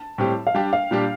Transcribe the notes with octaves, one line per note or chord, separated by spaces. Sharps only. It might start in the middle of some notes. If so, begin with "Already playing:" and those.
Already playing: A5
A2 G3 C4 G4
F5
G3 D4 G4 G5
F5
A#2 G3 D4 G4